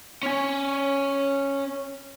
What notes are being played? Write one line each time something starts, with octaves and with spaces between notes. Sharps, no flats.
C#4 G#5